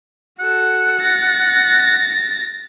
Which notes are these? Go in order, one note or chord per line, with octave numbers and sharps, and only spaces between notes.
F#4 A4 F#5
A6 A#6